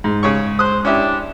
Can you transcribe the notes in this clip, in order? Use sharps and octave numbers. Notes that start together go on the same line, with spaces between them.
G#2
C#3 C#5 C#6
C5 D#6 F#6
C#4 D4 E4 G4